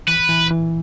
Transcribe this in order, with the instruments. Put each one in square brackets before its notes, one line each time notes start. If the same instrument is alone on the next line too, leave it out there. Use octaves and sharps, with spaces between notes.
[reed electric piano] E3 [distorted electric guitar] B4
[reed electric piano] E3
E3